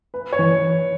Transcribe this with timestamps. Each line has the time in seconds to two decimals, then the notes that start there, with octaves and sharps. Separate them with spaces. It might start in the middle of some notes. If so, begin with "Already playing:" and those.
0.14 B4
0.33 C#5
0.39 E3